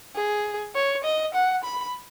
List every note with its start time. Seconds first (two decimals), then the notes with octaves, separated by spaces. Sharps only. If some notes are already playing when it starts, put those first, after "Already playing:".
0.15 G#4
0.75 C#5
1.04 D#5
1.34 F#5
1.64 B5